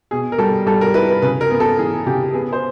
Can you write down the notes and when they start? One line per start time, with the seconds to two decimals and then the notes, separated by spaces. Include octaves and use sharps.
0.11 B2 G#4
0.32 A#4
0.38 G3 A4
0.67 G3 A4
0.81 A#4
0.94 E4 B4
1.09 B4
1.22 C#3 B4
1.41 A#4
1.50 B3
1.60 A4
1.78 E3 G#4
2.06 C#3 G4
2.34 B3 G#4
2.53 C5